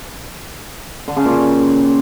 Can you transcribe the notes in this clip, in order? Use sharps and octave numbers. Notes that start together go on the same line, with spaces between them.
D3
C#3
A#2